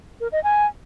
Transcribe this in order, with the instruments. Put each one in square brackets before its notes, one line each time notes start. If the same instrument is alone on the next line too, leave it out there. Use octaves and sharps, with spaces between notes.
[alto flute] A#4
D#5
G#5